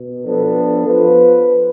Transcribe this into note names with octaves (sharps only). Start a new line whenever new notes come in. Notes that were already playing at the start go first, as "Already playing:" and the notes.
Already playing: B2
F3 B3 D4 A4
F3 B3 F4 B4